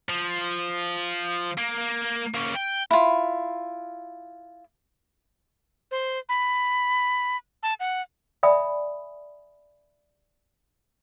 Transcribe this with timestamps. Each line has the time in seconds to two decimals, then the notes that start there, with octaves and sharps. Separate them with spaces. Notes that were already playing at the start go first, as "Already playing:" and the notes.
0.09 F3
1.58 A#3
2.34 A#3 C#4
2.55 G5
2.91 E4 F4
5.91 C5
6.29 B5
7.63 A5
7.80 F#5
8.43 D5 E5 G#5 B5 D#6